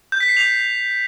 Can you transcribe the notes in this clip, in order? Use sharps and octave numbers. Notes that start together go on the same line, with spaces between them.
G6
B6
C7
F7